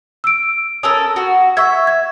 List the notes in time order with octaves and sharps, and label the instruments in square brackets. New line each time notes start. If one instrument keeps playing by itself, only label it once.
[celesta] E6 D7
[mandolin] C#4 A4 A#4 [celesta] D#6 E6
[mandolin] F#4
[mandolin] E5 [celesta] C#6 E6 G#6
[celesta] G#6